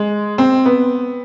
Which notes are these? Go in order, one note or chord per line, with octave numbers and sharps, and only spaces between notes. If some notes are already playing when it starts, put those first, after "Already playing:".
Already playing: G#3
C4
B3